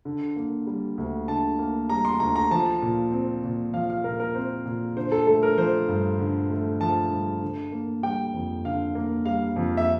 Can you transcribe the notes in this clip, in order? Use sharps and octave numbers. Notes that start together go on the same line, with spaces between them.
D3
A#3
G3
D2
D3 A5
A#3
G3 A#5
C6
D2 A#5
A#5
F3 A5
A#2
C4
A#2
F3 F5
F5
A#2 A#4
A#4
C4 C5
A#2
D3 C5
A4
A3 A4
A#4
F3 C5
G2
D3
A3
F3 A5
G2
D3
A#3
G3 G5
F2
D3 F5
A#3
G3 F5
F2
E5